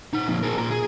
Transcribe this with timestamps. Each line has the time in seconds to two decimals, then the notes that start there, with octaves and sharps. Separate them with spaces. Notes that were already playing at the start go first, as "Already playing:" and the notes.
0.13 D#4 F#5
0.27 F2 A#2
0.43 G#4 A#4
0.58 A#2 A#4
0.71 G#4